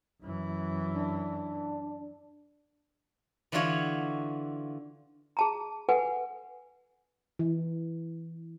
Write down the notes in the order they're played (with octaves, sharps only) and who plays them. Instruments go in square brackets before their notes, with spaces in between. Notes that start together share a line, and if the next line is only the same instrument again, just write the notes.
[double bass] F#2 E3
[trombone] D4
[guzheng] D3 E3 D4 F4 F#4 C#5
[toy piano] G#4 A5 A#5
A4 B4 F#5 G#5
[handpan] E3